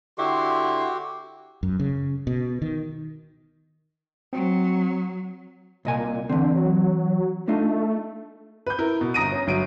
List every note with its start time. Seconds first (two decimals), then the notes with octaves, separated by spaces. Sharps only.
0.18 D3 E4 F#4 G4 C6
1.63 F#2
1.80 C#3
2.27 B2
2.62 D#3
4.33 F#3 C4
5.85 C2 A#2 D#5 G#5
6.29 D3 E3 C4
6.55 F#3
7.48 A3 D4 D#4 F4
8.66 B4 G6
8.79 E4 A#4
9.01 B2
9.14 G1 A#5 D#6 A#6 D7 D#7
9.32 C#4
9.47 G1 F#3 D7 D#7